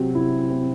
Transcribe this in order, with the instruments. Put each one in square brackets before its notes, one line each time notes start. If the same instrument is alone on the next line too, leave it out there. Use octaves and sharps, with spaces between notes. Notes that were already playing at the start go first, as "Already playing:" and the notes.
Already playing: [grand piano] C3 F#3 C4
E4
C4